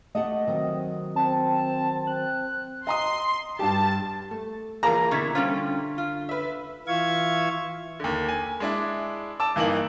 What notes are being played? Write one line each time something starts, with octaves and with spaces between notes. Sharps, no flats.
A3 G4 D#5 F#5
D#3 F#3 C4
C4 A5
C4 F#6
D#5 A#5 C6 D#6
G2 G3 G4 A5
A3
E3 A#3 F4 G#4 A5 A#5
B2 D3 E4 C#6 G#6 B6
D3 G3 C#4 F4 C5
F4
B4 E5
E3 F4 E5 F5 C#6 G#6
D#2 D3
G#5
G#3 D4 E4
A5 D6 E6
G2 E3 A#3 D#4 F#7